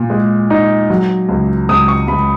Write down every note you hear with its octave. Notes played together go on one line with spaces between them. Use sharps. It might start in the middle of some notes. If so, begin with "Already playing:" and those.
Already playing: A#2
G#3
D#4
F#3
C#2
C#2 D#6
C#6
C#2 B5